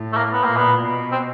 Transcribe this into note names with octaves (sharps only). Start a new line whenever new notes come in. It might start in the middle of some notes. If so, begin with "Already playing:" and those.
Already playing: A2
A3
A#3
B3
A#2 A#3
B3
B2
C4